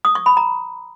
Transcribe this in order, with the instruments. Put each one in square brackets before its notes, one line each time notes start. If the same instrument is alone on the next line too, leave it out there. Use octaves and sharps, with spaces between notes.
[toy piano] D#6
C#6
B5
A#5